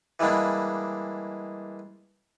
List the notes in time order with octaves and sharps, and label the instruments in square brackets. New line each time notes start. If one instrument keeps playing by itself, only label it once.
[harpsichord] E3 G3 G#3 A#3 D4